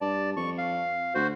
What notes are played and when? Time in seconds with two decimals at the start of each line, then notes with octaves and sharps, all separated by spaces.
0.01 G2 D5 A5
0.37 F2 C#6
0.58 F5
1.15 D2 F#4 C5